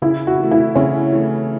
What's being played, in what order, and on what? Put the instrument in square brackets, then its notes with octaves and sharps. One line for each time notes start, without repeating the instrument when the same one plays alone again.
[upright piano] C#3 [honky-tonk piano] E4
[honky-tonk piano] F#4
[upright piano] E3 A3
[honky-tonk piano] E4
[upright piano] C#3 [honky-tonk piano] C#4
[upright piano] E3 A3